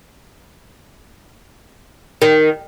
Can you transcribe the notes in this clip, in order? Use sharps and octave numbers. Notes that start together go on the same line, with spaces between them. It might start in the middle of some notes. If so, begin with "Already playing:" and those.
D#3